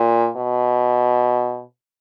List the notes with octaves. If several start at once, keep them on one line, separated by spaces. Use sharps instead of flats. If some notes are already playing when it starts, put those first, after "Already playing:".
Already playing: A#2
B2